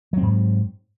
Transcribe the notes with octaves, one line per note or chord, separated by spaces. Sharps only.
G#2 F#3 C4